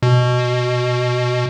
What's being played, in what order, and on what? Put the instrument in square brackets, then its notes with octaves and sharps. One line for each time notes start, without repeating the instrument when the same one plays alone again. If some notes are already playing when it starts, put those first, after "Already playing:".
[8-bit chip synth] B2